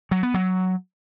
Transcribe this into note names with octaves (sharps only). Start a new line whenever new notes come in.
F#3
B3
F#3